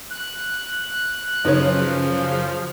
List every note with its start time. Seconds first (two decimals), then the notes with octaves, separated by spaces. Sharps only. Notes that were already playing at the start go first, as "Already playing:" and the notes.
0.11 F#6
1.45 F#2 C#3 F3 D#4 B4 C#5